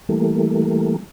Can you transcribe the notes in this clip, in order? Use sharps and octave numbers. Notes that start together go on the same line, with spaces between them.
E3 G3 A3 A#3